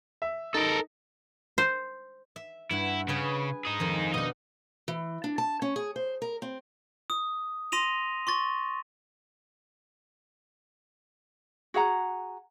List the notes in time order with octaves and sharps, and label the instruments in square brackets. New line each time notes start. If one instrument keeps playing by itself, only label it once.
[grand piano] E5
[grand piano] D#4 [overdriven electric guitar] A4 A#4
[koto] C5
[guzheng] E5
[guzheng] G2 F#5 [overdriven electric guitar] E4
[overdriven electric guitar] C#3 [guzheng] G#4 B4 G5
[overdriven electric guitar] D#4 G#4
[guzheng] F2 D#3 F3
[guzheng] B2 D4 [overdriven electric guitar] D#4 D#5
[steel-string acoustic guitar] E3
D4
A5
C#4
G#4
C5
A#4
C4
[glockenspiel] D#6
C6 A#6 D#7 F7
C6 C#6 A6
[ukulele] F#4 G#4 F#5 A#5